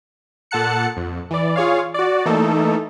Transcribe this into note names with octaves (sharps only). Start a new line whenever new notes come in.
A#2 A4 F#5 A5 F#6 C#7
F2
E3 D5
F4 G#4 C#5 F5
F#4 D5
E3 A3 A#3 D#4 A4